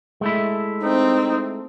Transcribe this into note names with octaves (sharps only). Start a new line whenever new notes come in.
G#3 A3 E4
C4 D#4